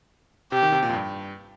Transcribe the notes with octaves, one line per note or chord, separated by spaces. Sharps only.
C3 G4
D#3
C3
A#2
F2
G2